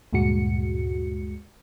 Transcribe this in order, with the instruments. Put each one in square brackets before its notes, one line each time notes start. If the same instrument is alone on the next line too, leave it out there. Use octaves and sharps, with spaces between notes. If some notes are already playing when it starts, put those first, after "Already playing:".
[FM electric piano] D2 G2 A#2 G#3 F#4 C#7